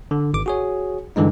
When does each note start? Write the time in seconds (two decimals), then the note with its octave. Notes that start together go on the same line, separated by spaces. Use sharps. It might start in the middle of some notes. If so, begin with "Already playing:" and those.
0.11 D3
0.34 G#1 D6
0.46 F#4 G#4 C#5
1.16 G2 D3 E3 G#3 D#4